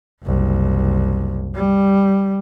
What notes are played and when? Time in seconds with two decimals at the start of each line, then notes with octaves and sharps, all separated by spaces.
0.23 F#1 C2
1.55 G3